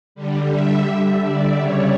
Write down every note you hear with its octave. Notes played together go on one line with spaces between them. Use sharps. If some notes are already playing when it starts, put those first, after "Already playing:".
D3 G3
E5
D5
C#3 G3 C#5